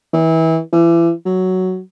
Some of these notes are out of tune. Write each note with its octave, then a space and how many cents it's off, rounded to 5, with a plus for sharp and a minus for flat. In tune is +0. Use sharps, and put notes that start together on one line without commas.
E3 -25
E3 +35
F#3 +5